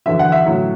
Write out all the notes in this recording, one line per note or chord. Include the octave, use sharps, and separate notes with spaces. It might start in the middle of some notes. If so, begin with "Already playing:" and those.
E2 D3 F#3 E5
F#5
E5
A2 F#3